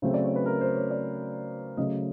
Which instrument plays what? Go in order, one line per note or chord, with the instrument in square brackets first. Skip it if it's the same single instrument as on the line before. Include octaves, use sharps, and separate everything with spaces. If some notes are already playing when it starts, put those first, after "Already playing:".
[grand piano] C#3 F#3 A3 C4 C5
D5
C#5
B4
A#4
C5
C#5
D5
C#3 F#3 A3 C#4 D#5